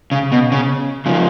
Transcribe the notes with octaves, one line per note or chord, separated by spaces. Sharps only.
C#3
B2
C#3
C#3 F3